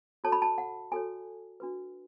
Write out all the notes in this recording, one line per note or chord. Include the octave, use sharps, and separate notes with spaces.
F#4 A4 C#5 A5
B5
A5
F#5
F#4 A4 C#5 G#5
D4 F#4 B4